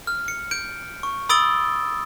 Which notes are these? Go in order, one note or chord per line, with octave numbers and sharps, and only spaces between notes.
F6
C#7
G6 D7
C#6
B5 D#6 E6 A6 D7 G7